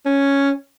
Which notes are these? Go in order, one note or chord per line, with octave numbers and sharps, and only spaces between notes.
C#4